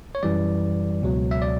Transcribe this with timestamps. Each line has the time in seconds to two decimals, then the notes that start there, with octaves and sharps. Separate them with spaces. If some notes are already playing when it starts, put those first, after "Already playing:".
0.15 C#5
0.23 F#2 E3 G3 D5
1.02 C#2 B2 F#3
1.31 E5
1.42 D5